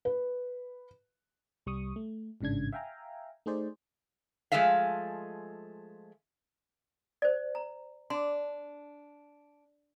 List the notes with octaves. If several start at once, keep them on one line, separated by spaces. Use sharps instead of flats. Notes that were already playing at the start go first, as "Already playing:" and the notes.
B4
C2 G3 C#6 D#6
A3
A1 G#2 C#3 D4 G#6
E5 F5 G5 G#5 A#5
A3 D#4 G#4 C5 D5
F3 G#3 A3 G#4 E5 F5
C5 D5
A#5
D4 C6